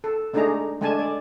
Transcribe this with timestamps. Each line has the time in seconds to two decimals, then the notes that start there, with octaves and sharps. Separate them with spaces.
0.04 A4
0.33 G#3 A3 D4 D#4 G#4 A#5
0.81 G#3 A3 D4 G#5 A5
0.99 D5